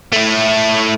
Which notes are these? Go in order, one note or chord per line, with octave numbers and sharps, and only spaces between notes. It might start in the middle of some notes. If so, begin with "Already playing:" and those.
A3 E4